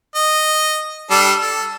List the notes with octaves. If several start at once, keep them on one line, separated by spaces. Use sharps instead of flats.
D#5
G3 D4 A4
A4